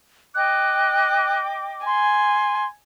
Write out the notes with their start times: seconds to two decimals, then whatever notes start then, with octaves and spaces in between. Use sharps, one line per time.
0.35 D#5 G5 D6 F#6
1.86 G#5 C6